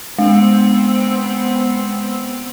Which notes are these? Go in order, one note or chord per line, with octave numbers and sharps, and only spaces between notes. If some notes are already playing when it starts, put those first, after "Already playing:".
G#3 B3 C4